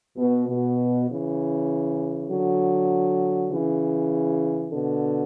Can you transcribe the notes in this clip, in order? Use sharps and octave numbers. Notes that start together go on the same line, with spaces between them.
B2
B2
C#3 E3
D3 F#3
C#3 E3
B2 D3